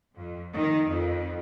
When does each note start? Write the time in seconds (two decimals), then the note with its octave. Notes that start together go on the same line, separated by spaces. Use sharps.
0.15 F2
0.56 D#3
0.89 F2